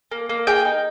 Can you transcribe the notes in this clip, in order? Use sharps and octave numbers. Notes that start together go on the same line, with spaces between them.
A#3
A#3
G#4 G5
D#4